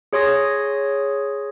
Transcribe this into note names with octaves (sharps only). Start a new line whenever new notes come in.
G#4 C#5 C6 D#6 A#6